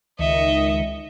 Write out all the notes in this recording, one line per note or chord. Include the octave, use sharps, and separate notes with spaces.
C#2 D#3 D#5 E5 C#7